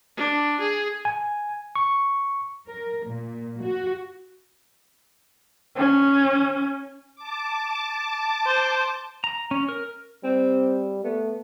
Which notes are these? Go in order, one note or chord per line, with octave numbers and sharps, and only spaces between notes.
D4
G#4
G#5
C#6
A#4
A#2
F#4
C#4
A5 D6
C5
A#5
C#4
A#4
G3 C4
A3 B3